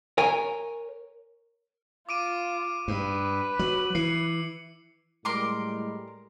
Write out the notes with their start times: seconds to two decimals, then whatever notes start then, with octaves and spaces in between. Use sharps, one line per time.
0.18 A#4 C#5 G#5
2.09 F4 D6 D7 D#7
2.88 G2 B4
3.59 F#3 F#7
3.95 E3 C7 C#7
5.25 A2 G3 G#3 A#4 C6 D6